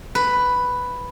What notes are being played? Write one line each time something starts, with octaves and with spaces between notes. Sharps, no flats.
B4